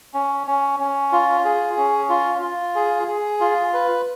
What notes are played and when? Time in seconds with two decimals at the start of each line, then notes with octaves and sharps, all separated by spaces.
0.14 C#4
0.47 C#4
0.80 C#4
1.12 F4
1.45 G#4
1.77 C#4
2.09 F4
2.42 F4
2.75 G#4
3.08 G#4
3.40 F4
3.74 B4